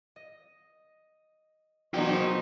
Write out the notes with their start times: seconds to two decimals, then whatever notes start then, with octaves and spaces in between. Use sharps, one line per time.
0.16 D#5
1.94 B2 E3 F#3 A#3 D#4 F#4 C5 G5